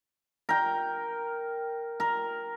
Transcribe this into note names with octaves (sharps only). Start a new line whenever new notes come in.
A#4 G5
A#4